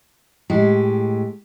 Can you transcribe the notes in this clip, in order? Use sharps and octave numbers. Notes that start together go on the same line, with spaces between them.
A2 G#3 G4